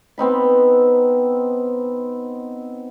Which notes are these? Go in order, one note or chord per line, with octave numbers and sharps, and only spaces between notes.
B3 C4 D#4 B5